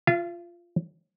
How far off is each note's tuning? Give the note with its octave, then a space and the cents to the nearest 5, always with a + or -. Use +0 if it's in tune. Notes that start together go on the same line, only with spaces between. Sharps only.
F4 -5 F5 -40